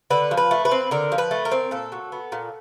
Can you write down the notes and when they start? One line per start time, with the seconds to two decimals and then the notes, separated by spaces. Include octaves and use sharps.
0.10 D3 B4
0.31 F3
0.37 B4
0.51 A3
0.65 B4
0.71 C4
0.91 D3 A#4
1.12 F3
1.18 B4
1.31 A3
1.45 A#4
1.52 C4
1.71 A#2 A4
1.92 F#3
2.12 B3
2.32 A#2